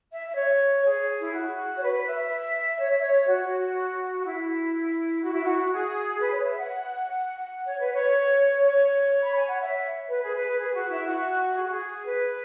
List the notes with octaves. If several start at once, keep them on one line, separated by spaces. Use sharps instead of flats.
E5
E5
C#5
G#4
E4
F#4
C#5
B4
E5
C#5
E5
C#5
F#4
F#4
E4
F#4
E4
F#4
G#4
B4
C#5
E5
F#5
C#5
B4
C#5
C#5
B5
G#5
F#5
E5
B4
G#4
B4
G#4
F#4
E4
F#4
G#4
F#4
G#4
B4